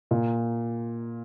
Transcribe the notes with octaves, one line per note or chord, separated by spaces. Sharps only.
A#2